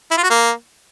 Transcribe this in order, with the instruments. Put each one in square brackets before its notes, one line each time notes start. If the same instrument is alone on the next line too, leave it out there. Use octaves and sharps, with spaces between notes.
[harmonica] E4
F4
F#4
A#3